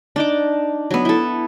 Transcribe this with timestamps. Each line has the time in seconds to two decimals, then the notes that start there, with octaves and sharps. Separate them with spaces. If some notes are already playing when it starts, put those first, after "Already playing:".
0.16 D4 D#4 D6
0.91 F#3 B3
1.05 E4 A4